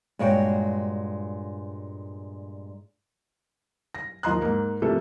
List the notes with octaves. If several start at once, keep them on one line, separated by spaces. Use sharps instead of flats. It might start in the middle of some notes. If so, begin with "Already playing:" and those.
G2 A#2 G#3 F#4 C#5 G5
A#6
D#2 F3 D#5 A#5 C6 F#6
G#2 A#3
C3 F3 G3 A3 A#3 A4